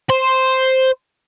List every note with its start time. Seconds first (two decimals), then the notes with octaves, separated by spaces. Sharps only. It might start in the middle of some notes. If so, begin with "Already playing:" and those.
0.10 C5